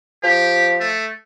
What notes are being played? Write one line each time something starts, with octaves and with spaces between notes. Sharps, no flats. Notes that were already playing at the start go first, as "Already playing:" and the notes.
F3 G4
A3